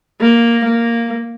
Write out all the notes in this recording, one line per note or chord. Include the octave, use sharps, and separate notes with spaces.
A#3
A#3